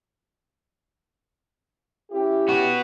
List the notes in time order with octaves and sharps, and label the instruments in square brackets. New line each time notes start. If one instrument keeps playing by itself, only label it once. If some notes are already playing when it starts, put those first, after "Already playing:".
[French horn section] C#4 E4 G4
[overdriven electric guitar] B3 F#4